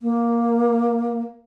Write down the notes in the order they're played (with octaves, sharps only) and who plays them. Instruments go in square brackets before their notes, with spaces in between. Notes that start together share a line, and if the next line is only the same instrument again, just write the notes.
[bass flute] A#3